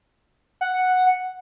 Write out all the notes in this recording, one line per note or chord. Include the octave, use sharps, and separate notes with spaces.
F#5